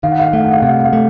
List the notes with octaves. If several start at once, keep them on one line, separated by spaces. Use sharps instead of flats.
D#3 F5
F#5
F5
F#5
A3 F5
F#5
F5
C3 F#5
F5
F#5
F5
A3